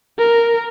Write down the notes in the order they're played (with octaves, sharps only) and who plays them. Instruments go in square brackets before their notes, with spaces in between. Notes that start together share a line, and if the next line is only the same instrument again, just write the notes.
[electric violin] A#4